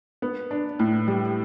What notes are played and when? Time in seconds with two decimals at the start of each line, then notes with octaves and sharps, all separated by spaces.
0.22 B3
0.51 D4
0.79 A2
1.08 G3